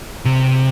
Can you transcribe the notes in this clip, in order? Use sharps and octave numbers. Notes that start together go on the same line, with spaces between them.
C3